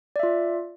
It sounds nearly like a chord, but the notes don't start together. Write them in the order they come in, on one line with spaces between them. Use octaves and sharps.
D5 E5 F4